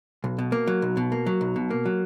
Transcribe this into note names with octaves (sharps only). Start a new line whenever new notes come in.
B1
B2
A#3
F#3
B1
B2
A#3
F#3
B1
B2
A#3
F#3